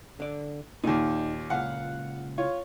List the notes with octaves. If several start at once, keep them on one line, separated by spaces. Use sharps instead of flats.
D3 D5
D#2 A#2 D#4
C#2 A#2 F5 F#5
F4 C#5